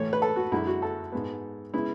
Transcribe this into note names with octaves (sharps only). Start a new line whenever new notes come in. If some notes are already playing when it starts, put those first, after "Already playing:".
Already playing: A2 E3 A3 C#5
B4
A4
F#4
F#2 D3 G#3 E4
F#4
A4
G#2 G#3 B3
C#3 G#3 B3 E4